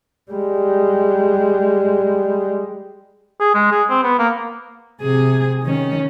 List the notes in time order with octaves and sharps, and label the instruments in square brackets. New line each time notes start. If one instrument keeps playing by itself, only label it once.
[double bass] G3 G#3
[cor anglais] G#4
G#3
G#4
C4
B3
A#3
[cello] C3 G#4
D#3 C#4